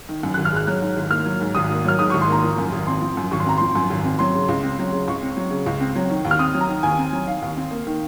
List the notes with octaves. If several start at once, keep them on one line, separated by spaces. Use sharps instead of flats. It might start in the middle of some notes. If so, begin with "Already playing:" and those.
D#3
F#2
G#1 F#6
F6
G#3 F#6
F#3 F#6
G#2
G#1
A#3 F6
F#3
G#2
G#1 D#6
A#3
F#3 F6
G#2 D#6
G#1 C#6
C6
A#3 A#5
F3
F#2
G#1
C4 C6
F3
F#2
G#1 C#6
C6
C4 A#5
F3 C6
F#2
G#1
C4
F#3 C6
C#3
C#2
C4
F#3
C#3
C#2 C#6
C4
F#3
C#3
C#2
C4
F#3
D#3
D#2
F6
C4 D#6
F#3
A#5
D#3
D#2 G#5
C4
F#3
D#3 F5
D#2
C4
A#3
D#3